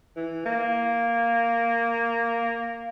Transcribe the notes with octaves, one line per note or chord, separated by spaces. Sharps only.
E3
A#3